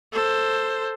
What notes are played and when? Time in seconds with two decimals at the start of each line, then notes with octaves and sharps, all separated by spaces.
0.14 A4 C5